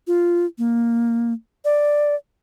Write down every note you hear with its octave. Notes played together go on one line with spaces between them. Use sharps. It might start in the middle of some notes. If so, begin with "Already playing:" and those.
F4
A#3
D5